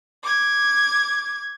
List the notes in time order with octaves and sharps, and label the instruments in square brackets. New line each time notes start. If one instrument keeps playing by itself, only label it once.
[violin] D6 G#6